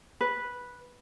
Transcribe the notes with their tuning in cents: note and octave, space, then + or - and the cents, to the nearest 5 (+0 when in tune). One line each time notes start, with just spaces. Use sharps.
B4 -5